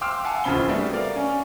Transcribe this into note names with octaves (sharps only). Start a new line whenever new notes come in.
F5 G5 C6 D6 E6 F6
F5 F#5 G#5 A5
D1 C#3 F3 C4 B5 G7
G3 A3 B3 D4 F#4
A#4 D5 F5
C#4